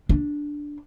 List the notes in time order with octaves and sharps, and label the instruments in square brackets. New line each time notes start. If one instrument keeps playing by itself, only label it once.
[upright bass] D4